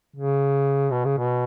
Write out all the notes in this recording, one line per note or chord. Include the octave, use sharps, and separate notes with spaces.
C#3
B2
C#3
B2